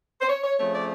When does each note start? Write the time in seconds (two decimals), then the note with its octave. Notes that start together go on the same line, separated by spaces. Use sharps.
0.21 C5
0.29 C#5
0.44 C#5
0.59 C#3 F3 A3 C4 C#5
0.74 D5